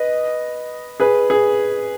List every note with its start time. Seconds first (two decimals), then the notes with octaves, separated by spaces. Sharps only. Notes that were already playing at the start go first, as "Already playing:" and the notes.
Already playing: B4 D#5
1.00 G#4 B4
1.30 G#4